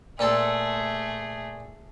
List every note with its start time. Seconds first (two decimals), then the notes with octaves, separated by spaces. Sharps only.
0.19 A#2 A3 C4 G#4 A4